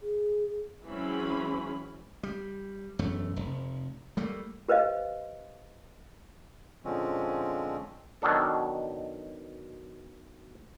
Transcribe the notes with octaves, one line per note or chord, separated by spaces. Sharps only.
G#4
E3 F#3 G#3 C4 C#4 B5
G3
E1 F#2 A3
F1
G3 A3 A#3
G4 B4 C5 D#5 F5
A#2 D3 F3 G#3 C4 C#4
B2 D#3 F#3 D4 A4